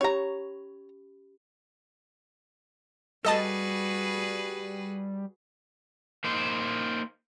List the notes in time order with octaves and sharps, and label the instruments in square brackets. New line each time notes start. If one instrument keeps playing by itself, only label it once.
[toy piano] C#4 G4 B5 [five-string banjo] C#5 A#5
[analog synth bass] G3 [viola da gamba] F#4 G#4 B4 [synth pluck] A4 D#5 A5
[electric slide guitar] A#3 D#4 C5